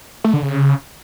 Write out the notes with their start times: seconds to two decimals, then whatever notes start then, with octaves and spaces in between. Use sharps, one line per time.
0.24 A3
0.34 D3
0.43 C#3